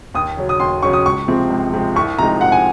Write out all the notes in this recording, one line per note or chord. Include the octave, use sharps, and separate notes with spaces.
D#2 D#6
C#3 F#3 C#4
D#6
D#2 C6
C#3 F#3 C#4 C#6
D#6
C#2 C#6
C3 F3 G#3 C4
C#2
C3 F3 G#3 C4
C2 C#6
C3 F3 G#3 D#4 A#5
C2 F#5
G#5